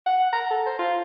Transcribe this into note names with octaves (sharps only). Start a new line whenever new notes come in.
F#5
A#5
A4
C5
F4